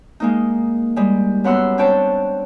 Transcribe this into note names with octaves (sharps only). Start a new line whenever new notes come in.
G#3 A#3 D#4
G3 G#3
F#2 B3 F#5 C6 E6
C4 D4 C#5 G5 A5